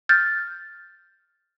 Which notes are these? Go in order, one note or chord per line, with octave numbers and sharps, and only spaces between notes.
F6 G6 A6